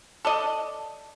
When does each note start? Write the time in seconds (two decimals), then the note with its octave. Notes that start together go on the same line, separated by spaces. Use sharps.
0.25 A4 D5 D#5